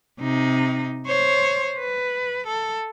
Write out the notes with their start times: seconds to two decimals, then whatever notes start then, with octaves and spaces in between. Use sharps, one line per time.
0.20 C3 D#4
1.06 C5 C#5
1.79 B4
2.47 A4